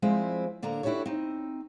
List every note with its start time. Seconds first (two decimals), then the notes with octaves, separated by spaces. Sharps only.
0.02 F3 G3 G#3 C4 E4
0.62 A2 D3 A#3 D4 A#5
0.83 D4 E4 F#4 G4 A4 C#5
1.06 C4 D#4